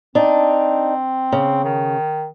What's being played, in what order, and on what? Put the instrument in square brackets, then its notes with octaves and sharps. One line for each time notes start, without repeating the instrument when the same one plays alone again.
[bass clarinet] C4 [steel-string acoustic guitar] D4 D#4
[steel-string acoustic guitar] C#3
[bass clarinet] D#3